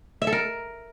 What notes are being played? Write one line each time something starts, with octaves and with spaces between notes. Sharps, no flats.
E5
A4
A#4